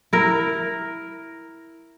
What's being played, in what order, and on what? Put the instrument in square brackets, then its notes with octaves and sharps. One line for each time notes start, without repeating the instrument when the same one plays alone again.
[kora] E4 A#4